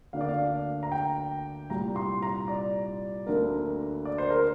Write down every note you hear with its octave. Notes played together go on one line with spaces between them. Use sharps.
D2 D3 A#3 D4 F5
D5
F5
A#5
G5
C2 A#2 G3 A#5
C6
A#5
D5
D2 D3 A#3 D4 A#4
D5
C5
A#4